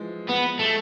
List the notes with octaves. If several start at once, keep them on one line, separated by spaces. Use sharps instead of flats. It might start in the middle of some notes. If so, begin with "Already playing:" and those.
Already playing: E3 F3 G#3
B3
A3